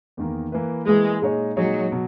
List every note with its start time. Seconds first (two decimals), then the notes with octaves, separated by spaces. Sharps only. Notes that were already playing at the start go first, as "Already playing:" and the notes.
0.17 E2 D#3 A#3
0.52 E3 A#3 E4 B4
0.87 E3 G#3 A#3 E4 B4
1.22 A#2 G#3 D#4 G#4 C#5
1.57 A#2 F#3 G#3 D#4 G#4 C#5
1.92 B2 F#3